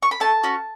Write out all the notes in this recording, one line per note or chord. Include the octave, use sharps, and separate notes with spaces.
C#6
B5
A3 A5
C#4 F#4